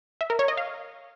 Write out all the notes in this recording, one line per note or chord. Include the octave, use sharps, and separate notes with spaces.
E5
A#4
C#5
D#5
F5